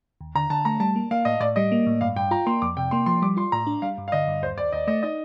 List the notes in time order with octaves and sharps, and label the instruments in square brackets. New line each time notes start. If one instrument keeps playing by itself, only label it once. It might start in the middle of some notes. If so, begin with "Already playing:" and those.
[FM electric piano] D#2
[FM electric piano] D3 [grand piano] A#5
[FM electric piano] D3 [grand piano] A5
[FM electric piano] A3 [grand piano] A#5
[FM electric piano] G3 [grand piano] A5
[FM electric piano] A#3
[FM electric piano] A#3 [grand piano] F5
[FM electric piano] A2 [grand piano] D#5
[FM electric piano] A2 [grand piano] D5
[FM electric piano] G3 [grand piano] D#5
[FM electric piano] A#3
A2
[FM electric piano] G2 [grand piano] F5
[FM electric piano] G2 [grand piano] G5
[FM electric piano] F4 [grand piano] A#5
[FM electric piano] A#3 [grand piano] C6
[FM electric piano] F2 [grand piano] D6
[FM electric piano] C3 [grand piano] G5
[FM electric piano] A#3 [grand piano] C6
[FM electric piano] F3 [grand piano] C6
[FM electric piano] G3 [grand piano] D6
[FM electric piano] F4 [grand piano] C6
[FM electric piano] A2 [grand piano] A#5
[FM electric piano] D4
[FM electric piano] G3 [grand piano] F5
[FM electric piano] G2
[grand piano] F5
[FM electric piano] D3 [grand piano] D#5
[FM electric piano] G2
[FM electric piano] D#2 [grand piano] C5
[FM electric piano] D#2 [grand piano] D5
[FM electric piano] D#2 [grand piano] D#5
[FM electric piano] A3 [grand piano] D#5
[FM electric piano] D#4 [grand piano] D#5